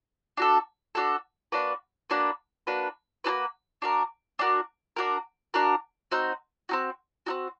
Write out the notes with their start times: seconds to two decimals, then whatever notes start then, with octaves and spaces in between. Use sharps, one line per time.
0.37 D4 F#4 A4
0.95 D4 F#4 A4
1.52 A#3 D4 F#4 B4
2.10 A#3 D4 F#4 B4
2.67 A#3 D4 F#4 B4
3.24 A#3 D4 F#4 B4
3.82 D4 F#4 A#4
4.39 D4 F#4 A#4
4.96 D4 F#4 A#4
5.54 D4 F#4 A#4
6.11 C4 D#4 F#4
6.69 C4 D#4 F#4
7.26 C4 D#4 F#4